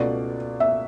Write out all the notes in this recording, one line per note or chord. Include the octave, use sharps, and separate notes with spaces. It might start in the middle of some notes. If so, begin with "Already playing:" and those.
Already playing: C#2 B2 A3 D5
E5